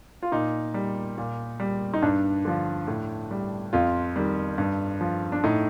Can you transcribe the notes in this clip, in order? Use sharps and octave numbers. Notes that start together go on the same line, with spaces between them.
F4
A#2 D#4
G3
A#2
G3
D#4
G2 D4
D3 F3
A2
G3
F2 F4
D#3 G3
G2
F3
D4
A2 D#4